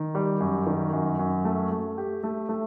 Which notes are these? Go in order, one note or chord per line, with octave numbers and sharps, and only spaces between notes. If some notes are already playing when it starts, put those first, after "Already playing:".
Already playing: D#3
G3
F#2
D#3
F#2
F#2
A3
A3
G4
A3
A3